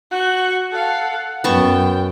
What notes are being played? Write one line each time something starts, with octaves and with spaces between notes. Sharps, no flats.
F#4 C#6 F#6
A4 F5 F#5
F#2 B3 G5 A5 C#6